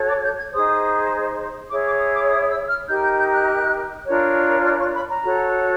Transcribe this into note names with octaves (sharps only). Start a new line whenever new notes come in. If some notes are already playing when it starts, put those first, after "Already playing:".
Already playing: F#4 A4 C#5
D6
G6
G#6
D#4 G#4 C5 D#6
E4 G#4 C#5 D6
D6
D#6
D6
D#6
E6
F6
D#4 G4 A#4 G6
G6
G6
F#6
D4 F4 A#4 C#5
F6
C#6
B5
A#5
F#4 A4 C#5